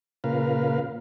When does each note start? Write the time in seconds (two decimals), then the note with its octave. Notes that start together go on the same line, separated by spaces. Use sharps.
0.24 A#2 C#3 F4 A#4 B4 F5